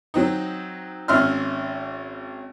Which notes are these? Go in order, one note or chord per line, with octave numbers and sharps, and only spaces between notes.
F#3 C4 D#4
G#1 C#4 E5 C6 F6